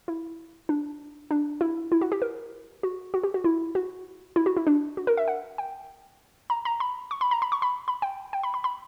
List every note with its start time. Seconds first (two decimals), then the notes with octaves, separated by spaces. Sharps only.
0.08 E4
0.69 D4
1.31 D4
1.61 E4
1.92 E4
2.01 F#4
2.12 G4
2.22 A#4
2.83 F#4
3.14 F#4
3.23 G4
3.34 F#4
3.44 E4
3.75 F#4
4.36 E4
4.46 F#4
4.57 E4
4.67 D4
4.97 F#4
5.07 A#4
5.17 E5
5.28 F#5
5.58 G5
6.50 A#5
6.65 A#5
6.80 B5
7.11 C#6
7.21 B5
7.31 A#5
7.42 B5
7.52 C#6
7.62 B5
7.88 B5
8.02 G5
8.33 G5
8.43 B5
8.54 B5
8.64 B5